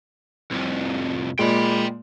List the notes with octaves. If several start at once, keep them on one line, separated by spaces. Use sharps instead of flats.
C2 F2
A#2 G#3 G5 B5